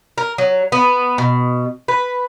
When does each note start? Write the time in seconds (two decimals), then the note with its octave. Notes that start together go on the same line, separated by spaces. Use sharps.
0.18 A#4
0.38 F#3
0.72 B3
1.18 B2
1.88 B4